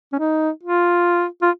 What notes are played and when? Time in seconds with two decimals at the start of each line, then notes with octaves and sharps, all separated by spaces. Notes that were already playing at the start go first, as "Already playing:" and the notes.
0.13 C#4
0.19 D#4
0.64 F4
1.42 F4